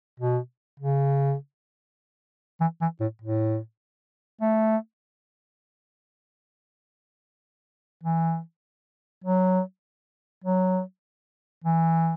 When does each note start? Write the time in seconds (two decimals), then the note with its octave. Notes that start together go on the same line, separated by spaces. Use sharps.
0.20 B2
0.80 C#3
2.60 E3
2.81 E3
3.01 A2
3.22 A2
4.41 A3
8.03 E3
9.24 F#3
10.44 F#3
11.64 E3